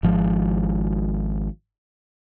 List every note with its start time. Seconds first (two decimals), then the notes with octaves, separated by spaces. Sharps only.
0.03 G#1 F3 G#3